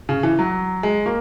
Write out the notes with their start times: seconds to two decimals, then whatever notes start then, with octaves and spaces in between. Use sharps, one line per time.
0.09 C#3
0.23 E3
0.39 F#3
0.83 G#3
1.06 A#3